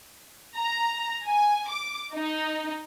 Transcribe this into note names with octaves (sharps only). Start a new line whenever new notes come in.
A#5
G#5
D6
D#4